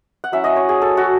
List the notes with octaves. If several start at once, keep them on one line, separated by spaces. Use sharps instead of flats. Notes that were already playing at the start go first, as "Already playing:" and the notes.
F#5
F#3 C#4 E4 E5
D#5
C#5
G#4
A4
F#4